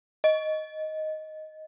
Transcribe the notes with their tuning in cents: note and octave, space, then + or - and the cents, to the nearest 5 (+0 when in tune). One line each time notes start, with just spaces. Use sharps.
D#5 +5